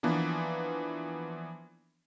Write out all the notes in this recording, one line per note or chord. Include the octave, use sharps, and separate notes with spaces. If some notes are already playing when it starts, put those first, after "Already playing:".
E3 F3 A#3 B3 D4